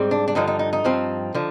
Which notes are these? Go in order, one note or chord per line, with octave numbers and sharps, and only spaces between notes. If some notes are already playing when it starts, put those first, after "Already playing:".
Already playing: G#2 G3 C4
D4
D4
G2 D3 F3 D#4
D#4
D#4
D#4
G2 F3 C4
D3 F3